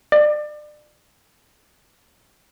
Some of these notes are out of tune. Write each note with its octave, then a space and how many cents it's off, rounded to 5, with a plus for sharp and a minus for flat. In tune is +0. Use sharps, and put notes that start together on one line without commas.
D5 +30